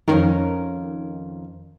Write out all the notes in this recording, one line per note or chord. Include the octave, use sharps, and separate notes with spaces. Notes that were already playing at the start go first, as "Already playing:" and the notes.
F2 D#3 C#4 A#4